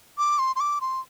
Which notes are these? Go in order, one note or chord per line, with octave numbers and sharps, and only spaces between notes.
D6
C6
C6
D6
C6